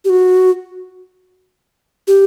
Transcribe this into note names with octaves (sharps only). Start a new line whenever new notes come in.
G4
F#4
G4